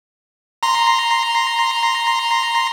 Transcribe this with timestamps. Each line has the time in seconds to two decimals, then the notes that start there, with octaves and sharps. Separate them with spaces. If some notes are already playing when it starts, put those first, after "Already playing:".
0.63 A#5 C6